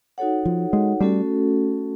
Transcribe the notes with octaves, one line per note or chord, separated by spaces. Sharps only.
D#4 F#4 A4 C#5 F#5
F3
G#3
G3 A3 C#4 F#4 A4